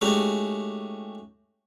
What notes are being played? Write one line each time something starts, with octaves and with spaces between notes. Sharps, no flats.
G#3 A3 C#4 D#4 F#4 G4